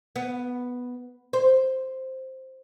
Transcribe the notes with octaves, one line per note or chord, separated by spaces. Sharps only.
B3
C5